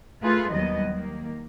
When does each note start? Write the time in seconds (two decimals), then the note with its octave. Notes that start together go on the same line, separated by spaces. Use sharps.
0.22 A3 F4 G#4 A4 B4
0.51 D#2 D#3 F#3 G3 B3 D#5
0.89 D#3 A#3